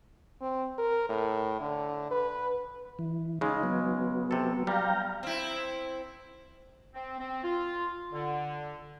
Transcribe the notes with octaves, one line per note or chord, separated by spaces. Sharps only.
C4
A#4
A2
D3
B4
E3
C#3 G#3 D#4
F#3 B3
C3 A4
G3 F5 G5 A#5
C4 E4
C4
C4
F4
D3